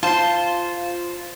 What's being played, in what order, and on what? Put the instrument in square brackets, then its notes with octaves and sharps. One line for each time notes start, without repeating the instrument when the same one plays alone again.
[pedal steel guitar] F4 C5 [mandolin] A5 C6